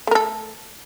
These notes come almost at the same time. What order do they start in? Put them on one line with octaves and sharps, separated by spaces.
A3 A#4 A4